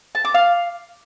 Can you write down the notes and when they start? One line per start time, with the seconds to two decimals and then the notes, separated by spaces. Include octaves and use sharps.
0.15 A5
0.25 D6
0.34 F5